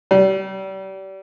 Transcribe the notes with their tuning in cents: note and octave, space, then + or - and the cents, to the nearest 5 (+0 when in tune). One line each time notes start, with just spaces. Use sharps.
G3 -30